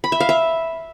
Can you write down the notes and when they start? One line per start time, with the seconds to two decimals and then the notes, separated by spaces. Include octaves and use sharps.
0.04 B5
0.12 E5
0.20 F5
0.29 E5